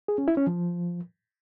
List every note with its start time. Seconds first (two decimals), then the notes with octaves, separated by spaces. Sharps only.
0.08 G#4
0.18 C#4
0.28 E4
0.37 C#4
0.47 F3